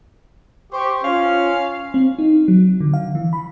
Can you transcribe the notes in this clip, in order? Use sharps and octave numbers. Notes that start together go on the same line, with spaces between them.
G4 C5 C#6
C#4 F4 F5
C4
D#4
F#3
D3
F5
E3
B5